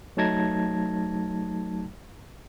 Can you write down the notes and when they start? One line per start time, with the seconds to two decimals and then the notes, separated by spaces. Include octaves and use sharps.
0.17 F#3 A3 D#4 A5 G#6 A#6